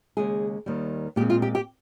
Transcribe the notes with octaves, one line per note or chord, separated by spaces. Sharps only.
D#2 C#3 G#3 G#4
D#2 D#3 G3
A#2 G#3 C4 G4
F4
G4
G4